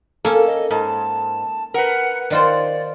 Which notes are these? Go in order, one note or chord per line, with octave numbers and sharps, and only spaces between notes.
A#3 C#4 A4
D#5
G#2 A5
A#4 B4 F#5
D#3 F4 C5 D5